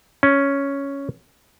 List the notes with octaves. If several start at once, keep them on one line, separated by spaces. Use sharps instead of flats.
C#4